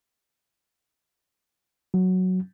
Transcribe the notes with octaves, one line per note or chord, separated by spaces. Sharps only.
F#3